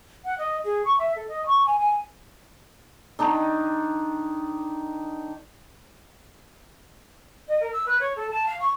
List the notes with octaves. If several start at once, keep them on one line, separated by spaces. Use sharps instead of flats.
F#5
D#5
G#4
C#6
E5
A4
D#5
C#6
G#5
G#5
D#3 D4 D#4
D#5
A#4
E6
B4
C#5
A4
A5
F5
C#6